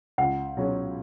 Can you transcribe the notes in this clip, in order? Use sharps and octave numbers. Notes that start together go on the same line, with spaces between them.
C#2 F#5
B2 F#3 C#4 G#4